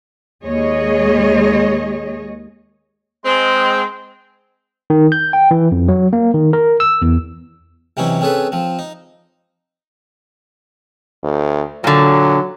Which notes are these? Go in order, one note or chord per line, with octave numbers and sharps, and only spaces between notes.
D#2 G#3 G#4 C#5 D#5
G#3 C4
D#3
G6
G5
E3
F2
F#3
A#3
D#3
A#4
E6
E2
C3 E3 F#3 C#4 D#4 E4
C4 C#4 G#4 A4 B4
F3 C4
D#4
D2
A#2 D3 F#3